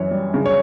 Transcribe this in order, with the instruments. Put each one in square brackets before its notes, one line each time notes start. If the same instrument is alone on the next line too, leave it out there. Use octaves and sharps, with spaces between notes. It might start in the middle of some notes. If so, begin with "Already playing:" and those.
Already playing: [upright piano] F#2 E3 [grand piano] C#5
[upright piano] G3
C#3
[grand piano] C#5